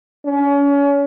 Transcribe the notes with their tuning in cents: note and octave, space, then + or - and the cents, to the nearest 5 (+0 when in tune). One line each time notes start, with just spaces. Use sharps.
C#4 +30